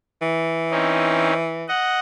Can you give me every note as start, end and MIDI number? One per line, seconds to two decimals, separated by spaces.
0.22 1.66 52
0.71 1.33 60
0.71 1.33 61
0.71 1.33 63
1.68 2.00 75
1.68 2.00 78